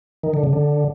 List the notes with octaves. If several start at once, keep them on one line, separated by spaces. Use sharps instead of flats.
D#3
D3
C#3
D3